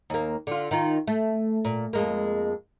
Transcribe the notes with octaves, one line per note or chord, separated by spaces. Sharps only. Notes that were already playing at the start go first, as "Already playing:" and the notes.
D#2 A#3
D3 F4
D#3 D#4 F4
A3
A#2
F2 G#3 A#3